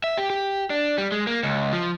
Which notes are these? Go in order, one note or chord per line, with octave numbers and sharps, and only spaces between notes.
E5
G4
G4
D4
G3
G#3
A#3
C#2
F3